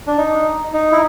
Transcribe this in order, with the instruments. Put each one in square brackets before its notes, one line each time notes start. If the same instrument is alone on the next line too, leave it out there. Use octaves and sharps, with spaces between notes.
[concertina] D4
D#4
D#4
E4